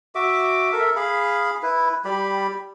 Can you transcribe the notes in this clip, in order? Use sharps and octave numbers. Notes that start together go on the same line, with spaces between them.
F#4 E5 D6
A4 A#4 E5
G#4 F5 B5
E4 B4
G3 G4 B5